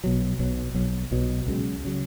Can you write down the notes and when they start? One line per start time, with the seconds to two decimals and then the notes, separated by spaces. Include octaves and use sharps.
0.04 B1 B2 F#3
0.39 B1 B2 F#3
0.74 B1 B2 F#3
1.11 B1 B2 F#3
1.47 C#2 C#3 F#3
1.85 C#3 F#3